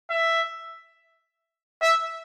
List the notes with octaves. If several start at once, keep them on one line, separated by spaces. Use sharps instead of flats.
E5
E5